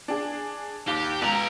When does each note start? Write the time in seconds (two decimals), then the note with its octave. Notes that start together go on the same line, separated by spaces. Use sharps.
0.08 D4 G#4
0.88 D#2 G4
1.22 C#2 B4 A#5